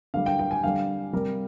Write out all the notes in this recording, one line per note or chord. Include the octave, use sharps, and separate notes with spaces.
D3 G3 F5
G5
G5
G#5
D3 G3 F5
C3 G3 A#4